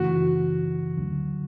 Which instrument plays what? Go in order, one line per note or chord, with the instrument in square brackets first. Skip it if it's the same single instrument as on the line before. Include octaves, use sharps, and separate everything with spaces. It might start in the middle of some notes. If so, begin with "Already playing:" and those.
Already playing: [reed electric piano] F#2 C#3 E3 A3 [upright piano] F#4
[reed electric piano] D2 D3 F#3